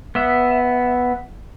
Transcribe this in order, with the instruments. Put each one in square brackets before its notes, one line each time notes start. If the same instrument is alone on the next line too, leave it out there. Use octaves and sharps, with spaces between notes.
[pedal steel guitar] B3 E5